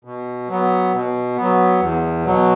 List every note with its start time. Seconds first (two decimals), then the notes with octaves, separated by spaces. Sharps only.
0.04 B2
0.49 F#3 B3
0.93 B2
1.37 F#3 B3
1.80 E2
2.25 B2 F#3